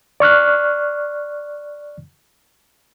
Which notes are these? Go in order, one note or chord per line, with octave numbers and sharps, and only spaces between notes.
D5 C#6 F6 F#6